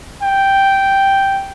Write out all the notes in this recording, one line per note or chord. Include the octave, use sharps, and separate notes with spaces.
G5